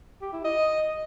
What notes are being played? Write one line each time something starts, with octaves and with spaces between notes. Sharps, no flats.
G4
E4
D#5